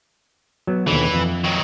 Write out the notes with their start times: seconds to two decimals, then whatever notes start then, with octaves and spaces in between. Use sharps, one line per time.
0.67 F#3 B3
0.87 D#2 B2 D3 E3
1.14 F2
1.44 D#3 F#3